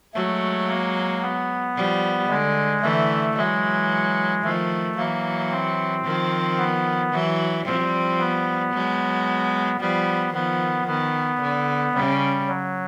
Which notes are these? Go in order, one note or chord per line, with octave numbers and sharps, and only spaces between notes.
F#3 G#3 A3
A#3
B3
F3 G3
D3 G#3
D3 E3 A3
E3 F#3 G#3
D#3 F3 A3
E3 F#3 A#3
C4
D#3 F3
B3
E3 F#3
F3 G3 C4
B3
F#3 G#3
F3 G3 B3
D#3 F3 B3
D#3 B3
D3
C#3 G3
F#3